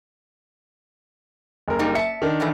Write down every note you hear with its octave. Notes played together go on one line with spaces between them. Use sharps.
F#1 A#4
G3 A#3 D#4
E5 A5 C#7
D#3 D4
A2 E3 A3